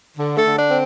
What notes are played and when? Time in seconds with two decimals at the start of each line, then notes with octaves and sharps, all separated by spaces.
0.18 D3
0.38 A3 A4
0.45 D3
0.58 D4
0.70 C4